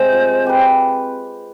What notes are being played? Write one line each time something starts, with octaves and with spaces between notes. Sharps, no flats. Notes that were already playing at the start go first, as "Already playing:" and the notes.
Already playing: C3 G#3 C5
F3
C4 G4 B4